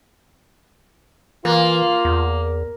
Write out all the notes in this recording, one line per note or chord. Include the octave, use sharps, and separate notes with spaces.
E3 A#3 F4
E2